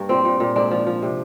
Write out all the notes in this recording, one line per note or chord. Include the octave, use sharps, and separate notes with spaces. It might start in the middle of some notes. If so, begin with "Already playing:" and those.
Already playing: G2 A#3
A#2 C4
A#2
A#2
G#2 D4
F3
F3
C3